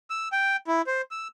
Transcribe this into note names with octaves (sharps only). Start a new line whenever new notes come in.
E6
G5
E4
C5
E6